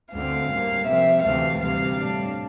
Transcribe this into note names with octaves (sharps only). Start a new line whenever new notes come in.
D2 D3 A3 C4 F5
A2 G3 A#3
C3 F3 C4 E5
D2 C3 E3 A3 C4 F5
D2 C3 G3 F5
A2 G3 D4